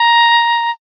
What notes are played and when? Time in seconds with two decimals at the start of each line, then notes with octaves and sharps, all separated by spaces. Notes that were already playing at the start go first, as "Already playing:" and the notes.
Already playing: A#5